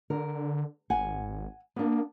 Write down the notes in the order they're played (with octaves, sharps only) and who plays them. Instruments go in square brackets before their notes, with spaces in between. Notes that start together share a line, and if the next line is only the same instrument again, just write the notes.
[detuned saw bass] D3 [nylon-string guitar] A#4
[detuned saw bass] G#1 [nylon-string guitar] F#5 G#5
[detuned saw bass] A#3 [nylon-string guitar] B3 D4